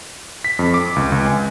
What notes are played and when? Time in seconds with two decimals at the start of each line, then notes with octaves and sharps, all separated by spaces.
0.45 B6
0.59 F2
0.74 D6
0.96 C#2
1.12 C#2
1.26 G#5